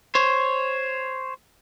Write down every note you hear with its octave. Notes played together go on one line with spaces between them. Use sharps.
C5 C#5